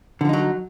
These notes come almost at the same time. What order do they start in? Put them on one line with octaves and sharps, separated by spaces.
D3 F3 D#4 F#3